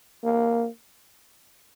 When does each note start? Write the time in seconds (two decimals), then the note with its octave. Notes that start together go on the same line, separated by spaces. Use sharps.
0.24 A#3